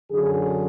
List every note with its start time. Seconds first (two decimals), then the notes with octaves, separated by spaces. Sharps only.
0.11 F#2 D3 F#3 G#4